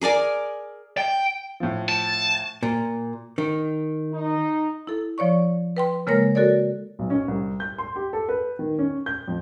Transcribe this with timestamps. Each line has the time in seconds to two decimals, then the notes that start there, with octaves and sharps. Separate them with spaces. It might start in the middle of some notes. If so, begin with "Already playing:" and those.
0.01 G#4 A#4 D5 G#5
0.97 G5
1.60 A2 F3
1.89 A5
2.63 A#2
3.38 D#3
4.12 D#4
4.87 E4 A4
5.18 F3 C#5 D5 C#6
5.77 B4 G5 C6
6.07 C#3 G#3 A#3 A#4 C#5 A#6
6.35 F#4 A4 A#4 C#5 D5
6.99 B1
7.10 C#4
7.28 C2
7.60 G6
7.78 C6
7.96 G4
8.13 A4
8.29 B4
8.59 D#3
8.79 C#4
9.06 G6
9.28 F2